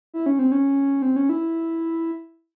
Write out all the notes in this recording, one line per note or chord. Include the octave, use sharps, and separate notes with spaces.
E4
C#4
C4
C#4
C4
C#4
E4